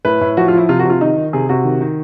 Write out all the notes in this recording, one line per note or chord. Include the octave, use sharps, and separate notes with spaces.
A2 B4
A2
F3 F#4
F4
F3 E4
C3 F4
F#4
C3 F4
D#3 D#4
D#3
C3 G#4
C3 F#4
D#3
D#3